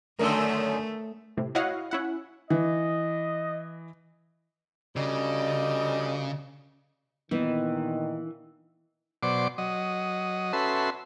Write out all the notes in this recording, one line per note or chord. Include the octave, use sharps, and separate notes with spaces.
F#2 D3 D#3 A3 A#4 D5 E6
A2 C3
E4 F#4 C#5 D#5 F5 F#5
C#4 E4 F#5
E3 D#5
D2 C#3 G3 D#5
A#2 D#3 E3 B3 D#4
B2 F#3 C5 D5 D6
F#3 D#5
C#4 F#4 A4 B4 E5 C6